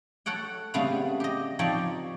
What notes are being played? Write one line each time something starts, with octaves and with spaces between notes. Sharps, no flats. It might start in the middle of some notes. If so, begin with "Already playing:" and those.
A4 C#5 F#5 G5
C#3 G3 A3 B3 C4 F5
G4 D#5
F3 C4 D#4 G4 C#5 D5